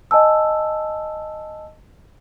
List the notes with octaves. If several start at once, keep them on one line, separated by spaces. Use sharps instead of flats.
D#5 G#5 A5 E6